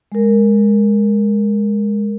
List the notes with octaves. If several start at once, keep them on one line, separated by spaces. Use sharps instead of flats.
G#3 A#4